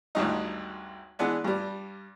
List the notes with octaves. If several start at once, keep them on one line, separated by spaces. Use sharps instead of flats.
G#1 D2 G2 D#4
E3 G#3 B3 D4
G2 G3